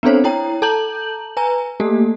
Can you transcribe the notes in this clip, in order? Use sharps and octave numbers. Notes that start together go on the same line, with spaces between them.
B3 C4 D4 A4 C5 C#5
E4 C#5 G5 A#5
A4 A5 A#5 G6 F#7
B4 G#5 A#5
A3 A#3 G4 A4